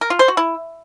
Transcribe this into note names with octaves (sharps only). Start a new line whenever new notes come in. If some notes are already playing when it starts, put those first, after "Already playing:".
A#4
F4
C5
F#4
E4